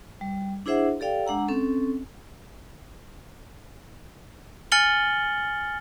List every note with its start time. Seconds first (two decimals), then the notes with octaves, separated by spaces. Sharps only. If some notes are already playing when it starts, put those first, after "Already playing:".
0.21 G3
0.66 D4 E4 G#4 C5 E5 F#5
1.00 G4 A4 D5 F5 G5
1.25 G#3 D4 F#5 A#5 E6
1.48 C4 C#4 A4
4.72 G#5 F6 A6 C#7 F#7 G7